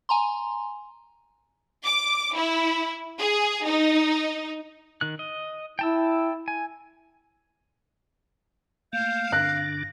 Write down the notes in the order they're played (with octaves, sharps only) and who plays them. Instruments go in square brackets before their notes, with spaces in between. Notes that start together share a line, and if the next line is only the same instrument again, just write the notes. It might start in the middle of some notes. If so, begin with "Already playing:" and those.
[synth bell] G#5 A#5 C6
[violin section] D6
E4
G#4
D#4
[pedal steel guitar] D#3 F#6
D#5
[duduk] E4 [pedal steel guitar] G5 A5 E6
[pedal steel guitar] G#5
[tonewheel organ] A3 A#3 [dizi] F5 [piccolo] G6
[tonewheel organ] G2 D3 D4 [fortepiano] F#6 [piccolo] A#6